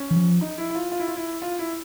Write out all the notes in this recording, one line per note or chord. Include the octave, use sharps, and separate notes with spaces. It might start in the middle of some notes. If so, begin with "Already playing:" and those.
Already playing: C#4
E3
F3
D#4
E4
E4
F4
F4
E4
F4
E4
F4
E4